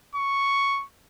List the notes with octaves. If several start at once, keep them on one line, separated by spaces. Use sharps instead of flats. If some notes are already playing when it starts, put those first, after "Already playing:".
C#6